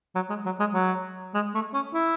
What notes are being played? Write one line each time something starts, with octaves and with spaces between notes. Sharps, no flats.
F#3
G#3
F#3
G#3
F#3
G#3
A3
C#4
E4